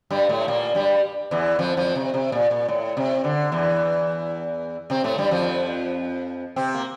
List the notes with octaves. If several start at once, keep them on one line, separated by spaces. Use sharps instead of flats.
G2 G3
A2 A3
A#2 A#3
G2 G3
E2 E3
F2 F3
F2 F3
C3
C3
A#2
A#2
A2
C3
D3
E2 E3
C3 C4
A2 A3
G2 G3
F2 F3
C3 C4
A#3